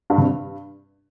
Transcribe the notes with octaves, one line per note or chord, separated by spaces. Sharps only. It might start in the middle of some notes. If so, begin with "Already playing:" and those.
G2
C3
G2